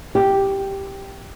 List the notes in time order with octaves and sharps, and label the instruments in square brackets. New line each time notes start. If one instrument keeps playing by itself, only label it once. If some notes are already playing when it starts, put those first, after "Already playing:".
[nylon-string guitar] G4